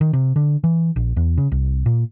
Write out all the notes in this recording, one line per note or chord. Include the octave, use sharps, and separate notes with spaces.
D#3
C3
D3
E3
A#1
E2
C#3
C2
A#2